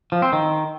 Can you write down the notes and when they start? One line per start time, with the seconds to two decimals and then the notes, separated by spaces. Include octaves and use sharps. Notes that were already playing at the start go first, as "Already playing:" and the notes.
0.12 F3
0.22 C4
0.33 D#3